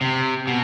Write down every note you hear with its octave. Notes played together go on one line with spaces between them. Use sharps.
C3
B2